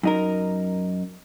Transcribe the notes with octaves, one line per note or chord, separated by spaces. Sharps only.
F#2 D#4 A#4